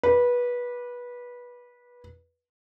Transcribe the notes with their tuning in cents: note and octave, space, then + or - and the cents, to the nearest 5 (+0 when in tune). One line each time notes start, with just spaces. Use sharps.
B4 -20 D5 +0